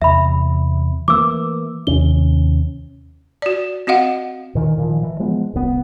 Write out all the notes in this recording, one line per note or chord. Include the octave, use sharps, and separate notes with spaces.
E2 C3 E5 B5
E3 A3 A#3 D6 E6
D#2 C3 C#4 G7
F#4 D5
C4 F#4 D#5 F5 F#5
A#2 D#3 E3
A#2 D#3 F3
E3
F3 G#3 B3
D1 C2 C#3 B3